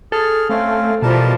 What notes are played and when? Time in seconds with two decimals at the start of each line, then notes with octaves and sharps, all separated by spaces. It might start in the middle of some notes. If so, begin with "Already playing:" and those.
0.12 G#4 A4 F6
0.49 A3 C4 C#4 F5
1.02 B2 E3 F3 G3 A#4 A5